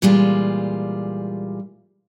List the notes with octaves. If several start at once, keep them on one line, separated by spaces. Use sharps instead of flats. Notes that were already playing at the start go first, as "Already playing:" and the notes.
A#2 E3 G3 G#3 F4